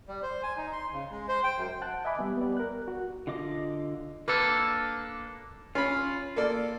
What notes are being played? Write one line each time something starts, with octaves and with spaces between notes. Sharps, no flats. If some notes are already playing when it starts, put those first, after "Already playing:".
G3
C5
G#5
D#4
C6
C#3
G#3
C5
G5
F#2
F#5 A5 F#6
D#5 E5 G#5 B5 D6
G3 B3
B3 G4 D5
A#4 F#6
F#4
D3 F4 D#5 D6
A#3 D4 A4 B4
C#4 F4 B5
A#3 A4 D5